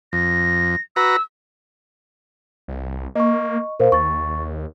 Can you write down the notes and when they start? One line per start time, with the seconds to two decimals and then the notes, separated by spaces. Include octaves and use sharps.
0.13 F2 A#6
0.96 F#4 B4 A#5 E6
2.68 C2
3.15 A#3 D#5 C#6
3.80 A#2 A#4 C5 F5
3.92 D#2 C#6 A6